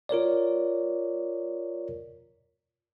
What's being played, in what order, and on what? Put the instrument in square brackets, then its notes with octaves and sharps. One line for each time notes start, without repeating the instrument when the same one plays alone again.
[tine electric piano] F4 A#4 C#5 D5